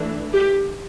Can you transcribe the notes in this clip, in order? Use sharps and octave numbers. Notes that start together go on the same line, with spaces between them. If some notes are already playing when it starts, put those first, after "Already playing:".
Already playing: E3 A3 D4
G4